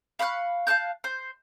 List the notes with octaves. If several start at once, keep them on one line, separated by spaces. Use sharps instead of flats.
F5 B5 C#6 F#6
F5 A5 F#6 G6
C5